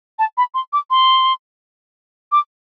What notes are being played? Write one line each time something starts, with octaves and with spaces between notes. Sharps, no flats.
A5
B5
C6
D6
C6
D6